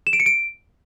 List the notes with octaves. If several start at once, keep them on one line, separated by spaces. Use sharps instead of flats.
E7
D7
C#7
D7